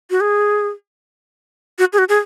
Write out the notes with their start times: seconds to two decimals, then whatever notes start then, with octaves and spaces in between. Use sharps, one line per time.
0.10 F#4
0.21 G#4
1.79 F#4
1.93 G#4
1.98 F#4
2.09 G#4